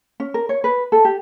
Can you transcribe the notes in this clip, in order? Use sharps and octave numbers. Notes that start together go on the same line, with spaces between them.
C#4
A#4
C#5
B4
A4
G4